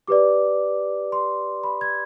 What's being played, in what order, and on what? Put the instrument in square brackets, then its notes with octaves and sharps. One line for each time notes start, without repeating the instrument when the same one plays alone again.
[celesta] G4 B4 D5 D6
C6
B5
G#6